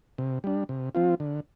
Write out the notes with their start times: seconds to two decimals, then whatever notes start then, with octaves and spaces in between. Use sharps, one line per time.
0.18 C3
0.44 G3 D4
0.69 C3
0.95 F3 C4 F4
1.20 D3